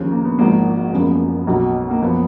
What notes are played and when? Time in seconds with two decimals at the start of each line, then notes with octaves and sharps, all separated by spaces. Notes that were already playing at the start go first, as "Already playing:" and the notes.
Already playing: D#2 C#3 F3 C#4
0.11 A#3
0.25 B3
0.39 G#1 G#2 F3 A#3
0.93 F#1 F#2 C#3 F3 B3
1.47 B1 B2
1.91 A#3
2.02 F#1 F3 B3